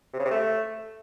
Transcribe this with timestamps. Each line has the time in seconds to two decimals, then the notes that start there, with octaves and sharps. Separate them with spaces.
0.13 C3
0.19 C#3
0.25 C3
0.31 A3